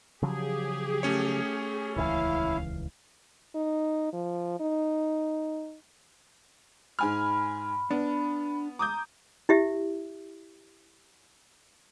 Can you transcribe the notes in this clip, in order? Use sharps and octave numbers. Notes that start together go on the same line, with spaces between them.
C#3 F3 F#3 G4 G#4
A3 C#4 C#5
D#1 C#2 E3 E4 F5
D#4
F3
D#4
G#2 G#5 B5 F6
B3 D4
A#5 D6 D#6 G6
E4 G4 E5